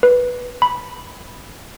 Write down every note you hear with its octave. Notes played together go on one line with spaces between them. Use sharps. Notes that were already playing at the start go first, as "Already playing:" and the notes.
B4
B5